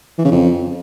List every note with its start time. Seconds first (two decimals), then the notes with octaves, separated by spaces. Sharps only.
0.18 E3
0.25 C#3
0.31 F2